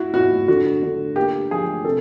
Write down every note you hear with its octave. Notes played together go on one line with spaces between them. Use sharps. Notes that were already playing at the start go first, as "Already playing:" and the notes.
Already playing: E4 F#4
E4 F#4
D3 F#4
D3
A#3 G4
F3 G#4
C3 A4